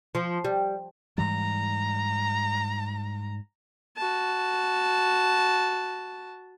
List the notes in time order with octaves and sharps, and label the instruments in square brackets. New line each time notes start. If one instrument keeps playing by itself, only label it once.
[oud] F3
G3
[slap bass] G#2 E3 G3 [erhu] A#5
[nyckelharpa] F#4 A5